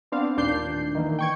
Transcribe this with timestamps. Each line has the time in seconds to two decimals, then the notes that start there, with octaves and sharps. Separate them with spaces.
0.12 B3 C4 D4 F5
0.37 A1 D#2 A#2 D4 G6 C7
0.95 D#3 E3 A#3
1.19 G5 C#6 G#6